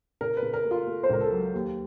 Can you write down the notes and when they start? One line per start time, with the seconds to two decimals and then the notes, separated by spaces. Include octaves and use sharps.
0.21 C#3 A#4
0.37 B4
0.42 C#3
0.54 A#4
0.65 A3
0.71 F4
0.87 A3
1.03 C5
1.10 C#2 A#4
1.21 A4
1.32 F#3
1.54 D#2